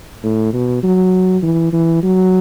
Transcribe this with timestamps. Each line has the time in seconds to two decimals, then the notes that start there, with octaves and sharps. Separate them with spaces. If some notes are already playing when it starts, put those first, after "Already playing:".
0.23 A2
0.54 B2
0.84 F#3
1.43 E3
1.73 E3
2.04 F#3